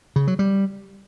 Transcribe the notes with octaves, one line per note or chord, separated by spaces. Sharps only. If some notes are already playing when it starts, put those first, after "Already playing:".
C#3
F#3
G3